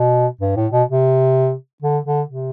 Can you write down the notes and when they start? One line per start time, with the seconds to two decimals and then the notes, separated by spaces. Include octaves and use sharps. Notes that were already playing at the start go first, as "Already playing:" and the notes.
Already playing: B2
0.41 G2
0.56 A2
0.72 B2
0.88 C3
1.82 D3
2.06 D3
2.29 C3